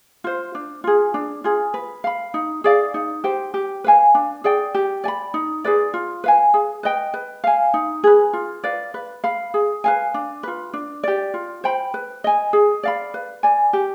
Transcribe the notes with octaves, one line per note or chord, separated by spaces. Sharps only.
F4 C5
D4
F4 G#4
D4
F4 G#4
B4
F5 B5
D#4
G#4 D5 F5
D#4
G4 C5 G5
G4
B4 F5 G#5
D4
G#4 D5 G5
G4
D5 G#5 B5
D#4
G#4 B4 D5
F4
B4 F5 G#5
G#4
B4 D#5 G5
B4
F5 G#5
D#4
G#4 B4
F4
B4 D5 F5
B4
F5 B5
G#4
B4 F5 G#5
D4
F4 B4
D4
G4 D5
F4
C5 G5 B5
B4
D#5 G#5
G#4
D5 F5 B5
B4
D5 G#5
G4